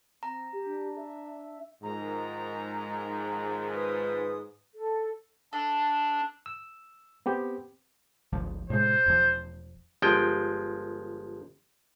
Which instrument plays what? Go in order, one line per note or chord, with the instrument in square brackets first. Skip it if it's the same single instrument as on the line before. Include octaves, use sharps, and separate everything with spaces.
[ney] C4 [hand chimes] A#5
[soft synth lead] G4
[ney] D4
[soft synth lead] E5
[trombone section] G#2 [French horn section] D#3 F3 [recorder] A#5
[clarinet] B4 [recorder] D#6
[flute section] A4
[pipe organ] D4 [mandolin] A4
[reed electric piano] E6
B3 C4 G4
[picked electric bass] G#1 D2 F3
[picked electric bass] A2 C3 G#3 [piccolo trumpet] C5
[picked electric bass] E1 F3
[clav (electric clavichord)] G1 F3 G#3 G5